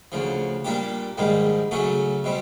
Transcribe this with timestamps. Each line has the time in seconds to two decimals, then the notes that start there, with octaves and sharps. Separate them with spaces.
0.12 D2 C#3 F3
0.64 A#2 G3 A#3 D4 G4
1.17 A#1 G#2 D#3 G3 A#3
1.71 C#3 F#3 A3 C#4
2.24 B2 G3 C4